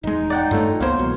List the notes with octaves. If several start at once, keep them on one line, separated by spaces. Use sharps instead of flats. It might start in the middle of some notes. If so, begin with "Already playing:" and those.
E1 G#3 D#4
D5 F#5 G5
G2 A3 F4 A4 C#5
C#2 A#3 B3 C5 C#5 F5
B1 B2 E3